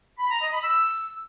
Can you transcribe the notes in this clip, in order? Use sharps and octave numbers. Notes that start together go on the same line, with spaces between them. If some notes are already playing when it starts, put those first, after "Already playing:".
B5
A#5
D#5
B5
E6